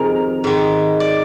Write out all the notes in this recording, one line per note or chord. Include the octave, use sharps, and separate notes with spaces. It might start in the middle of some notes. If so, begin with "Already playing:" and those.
Already playing: F2 C3 D#3 G#4 A#4
G#2 D#3
D5